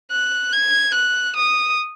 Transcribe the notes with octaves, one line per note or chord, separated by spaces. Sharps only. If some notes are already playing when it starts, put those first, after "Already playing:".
F#6
G#6
F#6
D#6